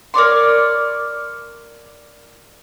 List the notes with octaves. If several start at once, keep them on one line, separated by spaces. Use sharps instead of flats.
A#4 C#5 D5 C6